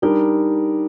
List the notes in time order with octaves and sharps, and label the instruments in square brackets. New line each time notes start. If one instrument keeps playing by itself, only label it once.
[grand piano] G3 D4 G4 A#4 [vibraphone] D#4